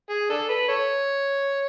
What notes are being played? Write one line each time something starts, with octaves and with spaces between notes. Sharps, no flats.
G#4
D4 A4
B4
A4 C#5